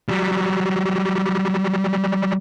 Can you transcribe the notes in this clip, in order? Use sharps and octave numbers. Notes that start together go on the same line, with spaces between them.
F#3 G3